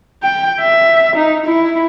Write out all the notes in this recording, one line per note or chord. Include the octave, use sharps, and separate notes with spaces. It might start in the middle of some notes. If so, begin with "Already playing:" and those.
G5
E5
D#4
E4